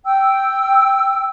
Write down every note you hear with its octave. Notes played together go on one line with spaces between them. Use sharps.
G5 E6